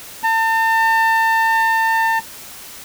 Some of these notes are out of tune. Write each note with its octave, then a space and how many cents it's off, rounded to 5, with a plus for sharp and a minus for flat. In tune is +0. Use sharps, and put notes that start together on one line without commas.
A5 +40